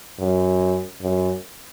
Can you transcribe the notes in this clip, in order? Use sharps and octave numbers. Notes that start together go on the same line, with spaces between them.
F#2
F#2